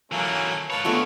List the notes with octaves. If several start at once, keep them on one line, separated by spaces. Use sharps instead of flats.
E3 F#3 A3 A#3 C#4
G#2 A4 B4 C#5 F5
D3 E3 G#3 A3 B3 F4